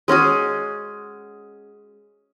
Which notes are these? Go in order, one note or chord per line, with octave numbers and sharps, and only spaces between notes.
G#3 C#4 F#4 G#4